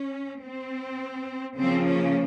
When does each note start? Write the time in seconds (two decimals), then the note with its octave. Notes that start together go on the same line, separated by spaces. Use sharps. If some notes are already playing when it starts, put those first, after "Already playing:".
Already playing: C#4
0.44 C4
1.57 C#3 F3 A#3 C4
1.86 C#4